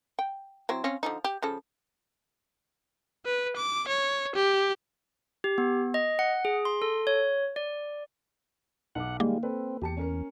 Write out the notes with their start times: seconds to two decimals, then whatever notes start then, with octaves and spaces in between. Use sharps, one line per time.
0.19 G5
0.69 F#3 C4 E4
0.84 C4 C#4 F5
1.03 D3 F3 D#4
1.24 G4
1.42 C#3 F3 A4
3.26 B4
3.56 D6
3.88 C#5
4.35 G4
5.44 G4
5.58 B3
5.94 D#5
6.19 F#5
6.45 G#4
6.65 C6
6.82 A4
7.07 C#5
7.56 D5
8.95 B1 F#5 D6
9.20 D#3 G3 G#3 A#3 F5
9.43 C4 A4 B4
9.82 E2 G4 A5 C#7
9.97 C#4 A#4 C#7